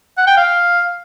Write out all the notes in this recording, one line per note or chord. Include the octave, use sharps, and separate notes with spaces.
F#5
G5
F5